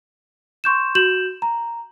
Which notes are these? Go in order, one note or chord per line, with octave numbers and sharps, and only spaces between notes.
C6 C#6 G6 E7
F#4 G6 E7 F#7
A#5